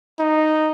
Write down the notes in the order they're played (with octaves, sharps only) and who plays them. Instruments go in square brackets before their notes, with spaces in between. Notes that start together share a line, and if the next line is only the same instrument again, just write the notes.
[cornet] D#4